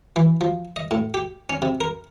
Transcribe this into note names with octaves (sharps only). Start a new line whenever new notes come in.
E3
F3
D#5
A2
G4
C#4
C3
A#4